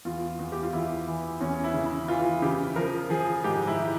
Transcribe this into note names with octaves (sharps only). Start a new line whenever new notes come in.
E2 F4
E2
G4
F4
E2 E4
E3
E2 C#4
E4
C#3
E4
E3 F4
C#3 G4
F3 A#4
F3 G#4
G#2 G4
E4